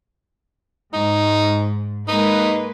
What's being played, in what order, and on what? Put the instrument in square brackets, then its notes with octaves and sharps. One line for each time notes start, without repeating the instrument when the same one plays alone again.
[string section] G#2 [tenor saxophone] D#4
[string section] G#3 A#3 B4 [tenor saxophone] D#4